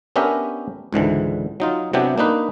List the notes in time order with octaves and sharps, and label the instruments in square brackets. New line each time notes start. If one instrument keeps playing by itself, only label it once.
[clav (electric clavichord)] B3 C#4 D4 G4 A#4 E5
C#2 G#2 D3 E3
F#3 D#4 F4
C3 F#3 B3 D4 E4 G4
A#3 D4 D#4 B4